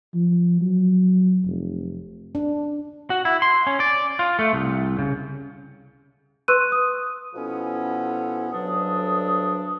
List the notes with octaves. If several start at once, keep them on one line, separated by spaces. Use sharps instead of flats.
F3
F#3
F1
D4
F#4
E4
C6
C#4
D5
F4
A3
C2
C#3
B4 C6 C#6 E6 F#6 D#7
D#6
B2 F3 B3 C#4 E4 A4
D2 G2 F#3 D4 A4 D#6